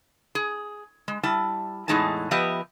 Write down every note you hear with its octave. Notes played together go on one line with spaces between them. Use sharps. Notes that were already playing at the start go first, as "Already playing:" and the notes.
G#4
G#3
G3 E4 A5
E2 A2 G#3 D#4 G#4 A5
F3 B3 G4 B4 D#5 E5